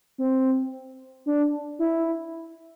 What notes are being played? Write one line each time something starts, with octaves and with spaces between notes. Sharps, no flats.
C4
D4
E4